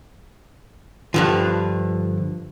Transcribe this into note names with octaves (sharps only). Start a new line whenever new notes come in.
G2 D3 F3